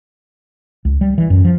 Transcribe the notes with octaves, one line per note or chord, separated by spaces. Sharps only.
C#2
G3
E3
F#2
F3